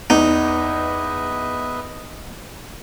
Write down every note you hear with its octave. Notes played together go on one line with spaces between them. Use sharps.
E2 D#4 B4 D#5 E5